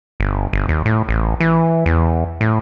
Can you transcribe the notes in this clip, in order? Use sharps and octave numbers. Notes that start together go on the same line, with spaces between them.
G1
G1
D#2
A2
A1
E3
E2
A2